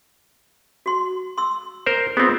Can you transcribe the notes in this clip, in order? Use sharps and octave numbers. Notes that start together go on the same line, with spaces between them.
F#4 C6
C6 E6
A#4 C5
B3 C4 F4 G#4